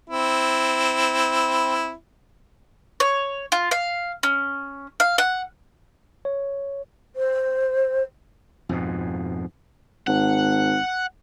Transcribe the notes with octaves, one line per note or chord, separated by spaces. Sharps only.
C4 E4
C#5
F4
F5
C#4
F5
F#5
C#5
C5
F2 G#2 B2
G#1 F#5